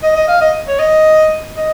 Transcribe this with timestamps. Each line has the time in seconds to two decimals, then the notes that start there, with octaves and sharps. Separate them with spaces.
0.03 D#5
0.16 D#5
0.28 F5
0.41 D#5
0.68 C#5
0.79 D#5
1.56 D#5